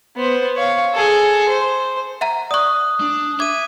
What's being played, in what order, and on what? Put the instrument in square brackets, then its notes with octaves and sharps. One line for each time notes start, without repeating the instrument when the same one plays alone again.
[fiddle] B3 C5
C#5 F5
G#4 A4
C5
[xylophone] E5 F#5 A#5
[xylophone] D5 C#6 [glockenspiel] D#6 F#6
[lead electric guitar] D4
[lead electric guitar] E5 [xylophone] D6 [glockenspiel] G#6 D#7